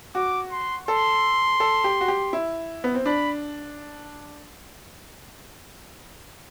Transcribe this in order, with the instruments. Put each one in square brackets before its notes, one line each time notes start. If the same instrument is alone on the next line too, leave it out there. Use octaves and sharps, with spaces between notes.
[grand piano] F#4 [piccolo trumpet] D6
[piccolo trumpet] C6
[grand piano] A4 [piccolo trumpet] C6
[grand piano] A4
G4
F#4
G4
E4
B3
C4
[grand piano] D4 [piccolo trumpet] B5